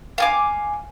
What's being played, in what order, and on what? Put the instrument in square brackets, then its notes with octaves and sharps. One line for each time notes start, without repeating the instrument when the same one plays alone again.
[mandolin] F5 G#5 D6